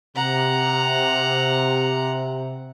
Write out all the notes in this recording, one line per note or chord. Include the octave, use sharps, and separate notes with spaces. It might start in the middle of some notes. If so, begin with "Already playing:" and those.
C3 F#5 A#5